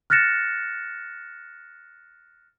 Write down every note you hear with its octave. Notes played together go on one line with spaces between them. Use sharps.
F6 F#6 A6 A#6 C#7 E7